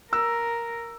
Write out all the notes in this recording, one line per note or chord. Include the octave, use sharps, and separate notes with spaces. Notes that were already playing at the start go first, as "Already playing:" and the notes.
A#4 E6